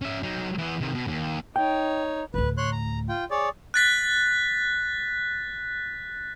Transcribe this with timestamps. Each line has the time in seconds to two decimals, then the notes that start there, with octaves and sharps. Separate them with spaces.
0.02 C#4 E5
0.23 F#3 D#4
0.58 E3 B3
0.81 C3 D#3
0.95 B2
1.07 D#2
1.56 D#4 C#5 G5
2.34 D2 A2 B4
2.58 C#5 C6 F#6
2.72 A#5
3.09 F4 G5
3.31 G#4 C#5 D5
3.74 F#6 A6 B6